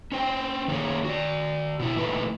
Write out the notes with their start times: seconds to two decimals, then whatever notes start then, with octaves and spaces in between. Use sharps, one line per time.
0.12 C#4 C5 G5
0.68 D#3 A#3 C#4 D#4 G#4 C#5
1.05 F#4 D5
1.79 B2 E4
1.96 A#2 E3 A3 D#4 B4